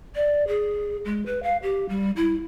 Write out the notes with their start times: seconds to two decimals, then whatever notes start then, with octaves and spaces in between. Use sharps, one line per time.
0.15 D5
0.47 G#4
1.05 G#3
1.26 B4
1.43 F5
1.63 G4
1.89 G3
2.16 E4